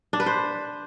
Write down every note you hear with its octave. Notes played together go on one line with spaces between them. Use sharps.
D4
B4
C5